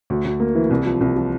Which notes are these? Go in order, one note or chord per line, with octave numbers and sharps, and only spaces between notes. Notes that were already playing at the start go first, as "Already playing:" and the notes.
D2
D2
A#3
E3
C2
F3
C2
F3